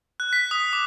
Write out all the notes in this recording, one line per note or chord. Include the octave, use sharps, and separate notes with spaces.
F#6
B6
D#6
D6